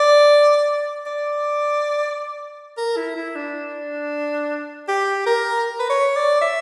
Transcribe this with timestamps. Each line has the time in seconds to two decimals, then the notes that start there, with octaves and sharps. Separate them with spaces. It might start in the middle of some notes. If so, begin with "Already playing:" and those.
Already playing: D5
1.06 D5
2.78 A#4
2.97 E4
3.16 E4
3.35 D4
4.88 G4
5.26 A#4
5.80 B4
5.90 C#5
6.16 D5
6.41 E5